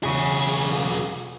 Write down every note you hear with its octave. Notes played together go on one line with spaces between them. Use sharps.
B1 E2 C#3 G#4